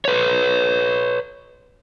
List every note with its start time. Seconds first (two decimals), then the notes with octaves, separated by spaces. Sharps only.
0.05 B4 C#5